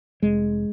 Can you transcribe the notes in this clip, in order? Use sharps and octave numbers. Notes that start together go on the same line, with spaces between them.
F1 G#3